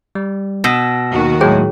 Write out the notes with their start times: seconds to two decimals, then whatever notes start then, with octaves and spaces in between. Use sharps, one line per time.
0.15 G3
0.64 B2 E6 A#6
1.09 D#2 D#3 F#4
1.41 A2 F#3 G#3 G#4 C#5 G5